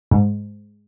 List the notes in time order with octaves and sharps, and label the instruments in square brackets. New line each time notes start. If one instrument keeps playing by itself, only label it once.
[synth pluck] G#2